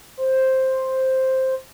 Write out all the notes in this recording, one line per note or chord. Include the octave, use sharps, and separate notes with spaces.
C5